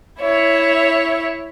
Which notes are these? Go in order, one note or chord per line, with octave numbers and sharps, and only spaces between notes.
E4 C#5 E5